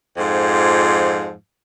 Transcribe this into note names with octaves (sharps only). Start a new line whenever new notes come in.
F2 G#2 F3